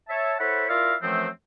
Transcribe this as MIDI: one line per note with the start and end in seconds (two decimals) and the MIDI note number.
0.09 0.34 73
0.09 0.34 76
0.09 0.34 81
0.39 0.65 64
0.39 0.65 69
0.39 0.65 72
0.39 0.65 73
0.39 0.65 78
0.39 0.65 83
0.69 0.95 64
0.69 0.95 65
0.69 0.95 70
0.69 0.95 74
0.69 0.95 76
0.69 0.95 77
1.02 1.28 42
1.02 1.28 52
1.02 1.28 53
1.02 1.28 57
1.02 1.28 60